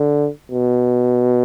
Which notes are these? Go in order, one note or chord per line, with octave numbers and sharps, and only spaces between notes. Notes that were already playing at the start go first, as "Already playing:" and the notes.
Already playing: D3
B2